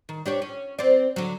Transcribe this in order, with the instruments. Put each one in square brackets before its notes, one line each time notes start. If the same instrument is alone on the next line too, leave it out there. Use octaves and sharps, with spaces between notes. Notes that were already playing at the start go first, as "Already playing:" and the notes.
[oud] D#3
D4 G4 C#5
C#4
C4 D5
D3 F#3